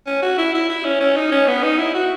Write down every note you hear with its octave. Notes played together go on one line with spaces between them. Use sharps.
C#4
F#4
E4
E4
E4
C#4
C#4
D#4
C#4
B3
D#4
E4
F#4